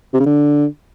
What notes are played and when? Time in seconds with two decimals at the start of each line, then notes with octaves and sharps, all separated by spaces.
0.14 C3
0.20 C#3
0.26 D3